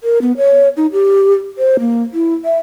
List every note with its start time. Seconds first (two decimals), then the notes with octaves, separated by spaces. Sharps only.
0.04 A#4
0.22 B3
0.37 C#5
0.77 D#4
0.92 G4
1.58 C5
1.80 A#3
2.14 E4
2.45 E5